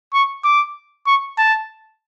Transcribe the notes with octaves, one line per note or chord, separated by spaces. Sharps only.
C#6
D6
C#6
A5